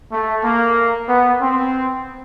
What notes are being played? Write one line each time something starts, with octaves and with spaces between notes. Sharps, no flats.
A3
A#3
B3
C4